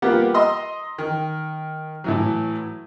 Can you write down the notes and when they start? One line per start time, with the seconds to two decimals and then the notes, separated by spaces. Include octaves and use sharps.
0.02 G3 A#3 B3 F4 G4 F#5
0.34 D#5 A#5 C6 E6
0.98 D#3
2.04 A2 E3 F#3